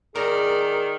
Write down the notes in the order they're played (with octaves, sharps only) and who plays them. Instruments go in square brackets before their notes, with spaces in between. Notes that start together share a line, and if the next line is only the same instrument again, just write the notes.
[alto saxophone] D#3 [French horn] G#4 [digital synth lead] A#4 [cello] D5